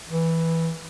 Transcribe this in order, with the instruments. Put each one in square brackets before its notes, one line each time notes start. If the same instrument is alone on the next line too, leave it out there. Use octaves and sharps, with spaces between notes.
[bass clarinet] E3